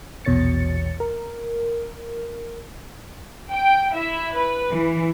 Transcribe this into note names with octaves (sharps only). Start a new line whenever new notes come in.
A#1 E2 B2 C#5 A6 C#7
A#4
G5
E4 E5
B4
E3